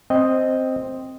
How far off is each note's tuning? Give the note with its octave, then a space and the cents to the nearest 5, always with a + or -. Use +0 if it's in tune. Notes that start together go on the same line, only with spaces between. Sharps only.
C4 +0 D#5 +0